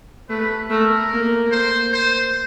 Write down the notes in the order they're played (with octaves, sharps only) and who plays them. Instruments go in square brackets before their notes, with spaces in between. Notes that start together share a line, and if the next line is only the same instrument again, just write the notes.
[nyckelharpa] A3 [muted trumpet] B4
[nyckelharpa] A3 [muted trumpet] A#4
[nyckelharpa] A#3
[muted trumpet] C5
C5